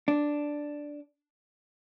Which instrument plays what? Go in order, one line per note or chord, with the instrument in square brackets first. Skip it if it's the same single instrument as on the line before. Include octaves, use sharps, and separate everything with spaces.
[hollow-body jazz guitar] D4